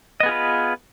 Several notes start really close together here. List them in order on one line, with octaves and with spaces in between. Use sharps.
D#5 B3 G#4 F4 B4